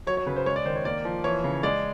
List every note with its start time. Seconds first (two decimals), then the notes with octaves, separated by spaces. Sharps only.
0.07 F#3 C#5
0.17 C#5
0.26 C#3 B4
0.36 C5
0.46 G#3 C#5
0.56 D5
0.66 D#3 C5
0.76 C#5
0.85 A#3 D5
1.05 F3
1.24 E3 C#5
1.44 C#3
1.63 G#3 D5